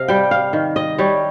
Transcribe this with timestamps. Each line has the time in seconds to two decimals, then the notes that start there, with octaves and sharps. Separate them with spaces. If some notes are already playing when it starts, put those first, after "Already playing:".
Already playing: C3 D#5 F5
0.08 G3 G5
0.31 F5
0.53 D#3
0.76 D#5
0.98 G3 C#5